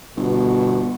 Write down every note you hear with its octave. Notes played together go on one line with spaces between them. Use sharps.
G1 B2